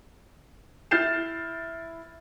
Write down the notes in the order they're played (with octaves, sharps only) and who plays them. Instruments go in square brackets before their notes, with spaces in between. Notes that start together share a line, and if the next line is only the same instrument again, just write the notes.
[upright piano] E4 F6 G6 A6 C7 E7